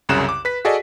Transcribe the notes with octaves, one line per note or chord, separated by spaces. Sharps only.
C2 F#2 C#3 F#6 E7
D6
B4 B6
F#4 G#4 A4 D5 D#5